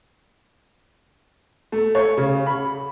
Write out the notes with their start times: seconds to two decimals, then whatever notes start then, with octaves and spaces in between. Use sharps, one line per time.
1.72 A3
1.95 C#5
2.17 C#3
2.46 B5